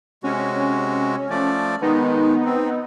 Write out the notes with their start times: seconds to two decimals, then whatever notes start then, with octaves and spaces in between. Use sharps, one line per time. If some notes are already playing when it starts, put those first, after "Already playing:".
0.24 C3 G#3 C#4 F#4
1.30 F3 A3 D5
1.81 D#3 G#3 B3 D#4
2.45 C4